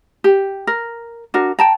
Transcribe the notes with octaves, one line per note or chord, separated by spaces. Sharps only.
G4
A#4
D4 F#4 A#4
G5 A5 A#5